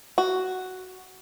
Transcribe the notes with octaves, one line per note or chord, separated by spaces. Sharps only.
F#4